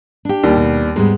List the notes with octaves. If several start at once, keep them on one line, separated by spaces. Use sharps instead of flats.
D4 G4
D#2 D#3 G3
B2
G#2 G3 G#3 B3